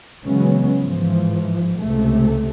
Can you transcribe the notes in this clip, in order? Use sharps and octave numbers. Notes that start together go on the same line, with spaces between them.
C#3 E3 F#3 G#3 B3 C#4
G#2 E3 F3
C#2 C3 A3